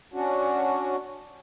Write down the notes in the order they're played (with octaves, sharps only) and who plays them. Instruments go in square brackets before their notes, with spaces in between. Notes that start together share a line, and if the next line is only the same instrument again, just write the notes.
[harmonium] C#4 D4 F#4